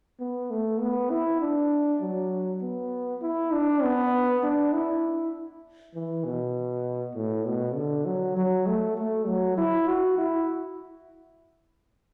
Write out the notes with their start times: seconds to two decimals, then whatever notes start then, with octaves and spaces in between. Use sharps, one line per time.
0.20 B3
0.50 A3
0.81 B3
1.10 E4
1.41 D4
2.01 F#3
2.62 B3
3.22 E4
3.53 D4
3.83 B3
4.44 D4
4.74 E4
5.95 E3
6.25 B2
7.16 A2
7.46 B2
7.76 D3
8.06 F#3
8.37 F#3
8.67 A3
8.97 A3
9.27 F#3
9.58 E4
9.88 F#4
10.18 E4